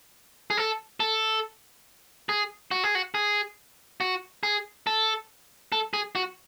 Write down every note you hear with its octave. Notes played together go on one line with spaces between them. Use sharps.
G#4
A4
A4
G#4
F#4
G#4
F#4
G#4
F#4
G#4
A4
A4
G#4
F#4